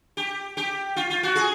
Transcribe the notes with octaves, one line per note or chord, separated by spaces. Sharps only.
G4
G4
F4
F4
F#4
G#4